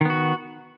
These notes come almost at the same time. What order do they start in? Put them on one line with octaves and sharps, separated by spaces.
D#3 B3 F#4